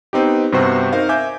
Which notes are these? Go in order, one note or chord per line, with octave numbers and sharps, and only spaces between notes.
B3 C4 D#4 G4
G2 C3 B3 C4 F#4 C5
D#4 A#4 C5 F5
E5 G#5 D6 G6